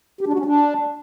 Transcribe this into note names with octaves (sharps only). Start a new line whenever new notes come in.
G4
D4
F#4
C#4
D4